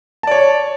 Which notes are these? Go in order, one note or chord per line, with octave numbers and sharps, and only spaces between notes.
C#5 D5 A5